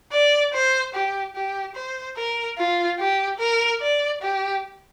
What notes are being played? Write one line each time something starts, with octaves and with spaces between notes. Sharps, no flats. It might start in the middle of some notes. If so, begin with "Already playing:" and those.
D5
C5
G4
G4
C5
A#4
F4
G4
A#4
D5
G4